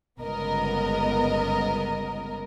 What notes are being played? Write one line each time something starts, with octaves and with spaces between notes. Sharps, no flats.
G1 C#2 B3 A#4 D#5